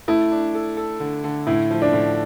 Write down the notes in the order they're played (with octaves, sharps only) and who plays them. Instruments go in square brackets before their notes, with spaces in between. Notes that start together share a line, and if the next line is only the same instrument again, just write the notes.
[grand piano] A3 [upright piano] E4
[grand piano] D4
A4
A4
D3
D3
[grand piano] A2 [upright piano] E4
[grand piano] F3
[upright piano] D4
[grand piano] A2